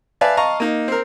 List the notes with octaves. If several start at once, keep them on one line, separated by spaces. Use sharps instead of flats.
B4 D5 E5 F5 G#5 A5
D#5 F5 A5 A#5 C#6
A#3 D#4
C4 A#4